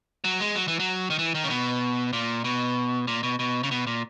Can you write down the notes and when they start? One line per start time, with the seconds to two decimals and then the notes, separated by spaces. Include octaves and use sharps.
0.24 F#3
0.40 G#3
0.56 F#3
0.68 E3
0.79 F#3
1.10 D#3
1.19 E3
1.35 D#3
1.44 C#3
1.50 B2
2.13 A#2
2.44 B2
3.07 A#2
3.23 B2
3.39 B2
3.63 C#3
3.71 B2
3.87 A#2